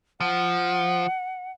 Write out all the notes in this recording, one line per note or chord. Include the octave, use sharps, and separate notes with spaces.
F3 F#5